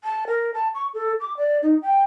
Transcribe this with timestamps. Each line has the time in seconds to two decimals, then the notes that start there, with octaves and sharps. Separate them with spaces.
0.04 A5
0.27 A#4
0.54 A5
0.75 C#6
0.94 A4
1.20 D6
1.37 D5
1.63 D#4
1.82 G5